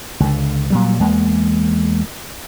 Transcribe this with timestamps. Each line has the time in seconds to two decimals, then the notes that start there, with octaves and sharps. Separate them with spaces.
0.20 C#2 D3
0.70 A#2 F#3 G3
0.99 E2 G#3 A#3